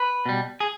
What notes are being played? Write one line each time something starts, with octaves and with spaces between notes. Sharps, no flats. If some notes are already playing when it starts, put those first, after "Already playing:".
Already playing: B4
B2 G3
G#4